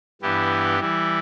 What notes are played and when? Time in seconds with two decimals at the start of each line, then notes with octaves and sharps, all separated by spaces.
0.21 G2 E3 B3 E4 G4
0.80 E3 G3 E4